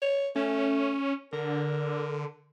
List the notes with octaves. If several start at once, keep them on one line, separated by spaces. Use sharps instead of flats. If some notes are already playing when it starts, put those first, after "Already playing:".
C#5
A3 C#4
D3 A#4